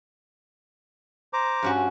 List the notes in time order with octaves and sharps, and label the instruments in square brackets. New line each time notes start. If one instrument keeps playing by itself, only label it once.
[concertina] C5 A#5 D6
[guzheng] G2 C#4 F#4